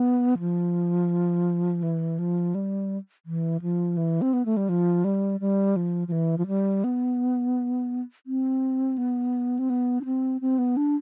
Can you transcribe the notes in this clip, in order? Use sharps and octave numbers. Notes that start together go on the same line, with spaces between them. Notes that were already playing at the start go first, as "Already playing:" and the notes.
Already playing: B3
F3
E3
F3
G3
E3
F3
E3
C4
B3
A3
G3
F3
G3
G3
F3
F3
E3
F3
G3
B3
C4
B3
C4
B3
D4
C4
C4
B3
D4